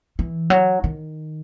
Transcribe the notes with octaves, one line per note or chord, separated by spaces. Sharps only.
E3
F#3
D#3